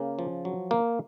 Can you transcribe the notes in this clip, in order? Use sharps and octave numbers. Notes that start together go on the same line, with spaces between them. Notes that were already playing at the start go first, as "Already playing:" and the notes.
Already playing: C#3 A#3
F3
F#3
A#3